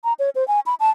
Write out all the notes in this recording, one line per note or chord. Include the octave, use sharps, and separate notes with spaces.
A#5
C#5
C5
G#5
B5
A5